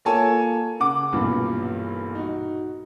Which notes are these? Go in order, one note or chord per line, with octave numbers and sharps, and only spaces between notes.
A#3 F4 A4 C#5 G#5 A5
C#3 F#5 D6
B1 G2 A#2 E3
D#4 F#4